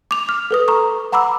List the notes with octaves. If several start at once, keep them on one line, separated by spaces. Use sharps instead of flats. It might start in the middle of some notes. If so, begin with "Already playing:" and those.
D6 F7
F6
A4 B4 D#6
A#5 C#6
F#5 A#5 B5 D6 E6